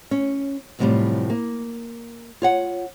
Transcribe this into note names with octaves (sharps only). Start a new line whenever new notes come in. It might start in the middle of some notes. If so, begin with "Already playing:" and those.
C#4
F#2 A2 C3 E3 F3 G3
A#3
F4 C#5 F#5